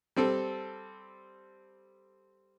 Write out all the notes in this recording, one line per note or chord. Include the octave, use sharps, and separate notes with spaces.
G3 C4 A4